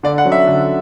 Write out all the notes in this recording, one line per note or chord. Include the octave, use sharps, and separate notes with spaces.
D3 D5
F#5
F#3 C#4
E5
D3